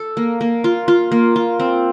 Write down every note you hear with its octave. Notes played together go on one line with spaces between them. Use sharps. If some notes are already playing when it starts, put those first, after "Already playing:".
Already playing: A4
A#3
A#3
F4
F4
A#3
F4
C4